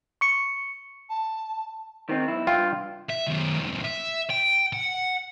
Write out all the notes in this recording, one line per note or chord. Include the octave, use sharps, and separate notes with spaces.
C#6 C#7
A5
D#3 C4 D#4
B1 E4
G2 F4 G5
E5
F#2 D#3
B1 F2
E5
G5
F#5